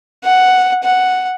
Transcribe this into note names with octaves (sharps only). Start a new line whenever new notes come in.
F#5
F#5